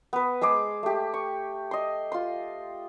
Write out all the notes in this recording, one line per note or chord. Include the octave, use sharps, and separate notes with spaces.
B3 B4
G#3 G#4 C5 D6
A3 G4
C#6
D#5 C6
F4 C6